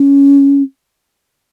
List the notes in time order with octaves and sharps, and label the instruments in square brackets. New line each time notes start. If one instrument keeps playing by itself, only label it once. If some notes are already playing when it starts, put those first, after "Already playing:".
Already playing: [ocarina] C#4